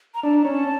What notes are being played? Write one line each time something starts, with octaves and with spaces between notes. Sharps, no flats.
A#5
D4 A5
C#4